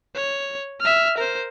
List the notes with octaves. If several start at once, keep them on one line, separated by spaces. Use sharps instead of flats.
C#5
E5 F6
A#4 C5